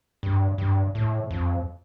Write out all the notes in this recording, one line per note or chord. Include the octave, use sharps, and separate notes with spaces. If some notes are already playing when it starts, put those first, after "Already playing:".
G2
G2
A2
F2